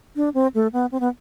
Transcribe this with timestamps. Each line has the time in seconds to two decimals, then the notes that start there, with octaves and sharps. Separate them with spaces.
0.16 D4
0.34 C4
0.54 A3
0.73 B3
0.92 C4
1.00 B3